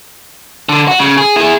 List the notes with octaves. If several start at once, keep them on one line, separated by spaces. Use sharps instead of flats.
D3
F#4
C#3
G#4
E4 G#4